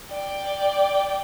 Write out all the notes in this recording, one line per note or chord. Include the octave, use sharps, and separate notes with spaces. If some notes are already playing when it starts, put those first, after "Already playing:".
D5 G5